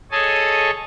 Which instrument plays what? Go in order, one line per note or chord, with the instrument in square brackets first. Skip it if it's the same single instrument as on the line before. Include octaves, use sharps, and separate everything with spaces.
[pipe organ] G#4 A4 C#5 D#5 G#5 A5